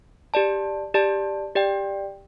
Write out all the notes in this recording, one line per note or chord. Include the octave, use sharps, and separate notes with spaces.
G4 D5 A5
G4 D5 A5
G4 D5 G5